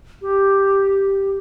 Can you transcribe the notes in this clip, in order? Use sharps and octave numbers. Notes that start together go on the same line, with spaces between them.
G4